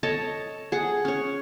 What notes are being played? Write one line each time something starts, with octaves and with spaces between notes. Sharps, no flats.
A4 C#5 D#5 A5
G#4 F#5
C#4 C#5